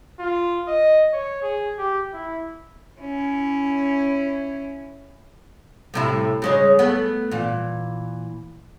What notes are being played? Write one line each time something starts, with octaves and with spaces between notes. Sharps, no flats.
F4
D#5
C#5
G#4
G4
E4
C#4 E4
A2 C3 E4
C#3 G#3 C#5
A3 B3
A#2 E3